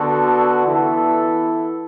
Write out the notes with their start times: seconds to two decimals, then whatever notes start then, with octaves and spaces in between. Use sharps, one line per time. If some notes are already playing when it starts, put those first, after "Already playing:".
Already playing: D3 B3 F#4 A4
0.65 E3 B3 E4 A4